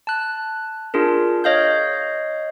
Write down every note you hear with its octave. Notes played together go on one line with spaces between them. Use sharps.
A5 F#6
D4 F4 G#4 A#4
C#5 D#5 F5 G6